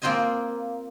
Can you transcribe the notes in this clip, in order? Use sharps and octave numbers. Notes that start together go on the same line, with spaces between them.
A#3 C4 F4 C5 D#5 G#5